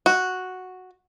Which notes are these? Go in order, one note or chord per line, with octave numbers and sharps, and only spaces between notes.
F#4